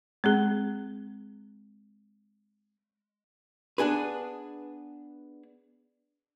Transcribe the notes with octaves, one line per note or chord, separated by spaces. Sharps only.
G#3 C4 G#4
B3 D4 G#4 B4